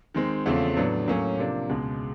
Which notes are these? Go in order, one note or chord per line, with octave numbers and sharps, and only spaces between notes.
D#3 G#3 C4
E2 C#3 F3 A3 C4
A2 F#3 B3 D4
A2 F#3 A#3 C#4
C3 F3 A#3 D4
C#2 B2 G#3